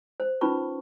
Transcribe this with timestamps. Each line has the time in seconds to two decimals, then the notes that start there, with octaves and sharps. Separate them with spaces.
0.20 C5
0.41 C#4 D#4 F4 B4 B5 C#6